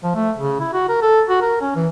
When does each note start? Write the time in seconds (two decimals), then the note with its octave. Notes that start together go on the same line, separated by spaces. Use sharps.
0.04 F3
0.15 A3
0.38 C#3
0.60 E4
0.74 F#4
0.89 A#4
1.02 A4
1.29 F#4
1.41 A#4
1.61 C#4
1.76 E3